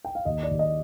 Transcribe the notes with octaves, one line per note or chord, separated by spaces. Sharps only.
G5
F5
D#2 D#5
D5
D#2
D#5